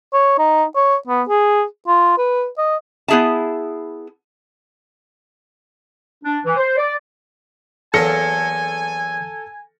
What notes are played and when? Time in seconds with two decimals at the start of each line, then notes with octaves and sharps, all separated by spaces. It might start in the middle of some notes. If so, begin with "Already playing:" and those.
0.14 C#5
0.39 D#4
0.76 C#5
1.08 B3
1.28 G#4
1.87 F4
2.18 B4
2.58 D#5
3.08 B3 E4 G#4 E5 A5
6.23 D4
6.45 E3
6.57 C5
6.77 D5
7.94 E2 F#3 A#3 A4 G#5 A#6 C#7